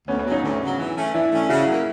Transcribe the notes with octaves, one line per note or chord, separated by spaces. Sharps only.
D2 B3 C#4
B3 C#4
C#3 F#3
C#4 D#4
D2
C#3 F#3
E3
A3 C#4
E3 D4 E4
A3 C#4
C#3 E4 F#4
F#3
A#3